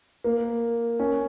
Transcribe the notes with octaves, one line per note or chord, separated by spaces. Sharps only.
A#3
C#4